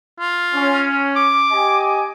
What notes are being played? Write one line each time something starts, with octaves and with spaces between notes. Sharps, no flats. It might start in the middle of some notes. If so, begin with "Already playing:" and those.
F4
C#4
D6
G4 D#5 G#5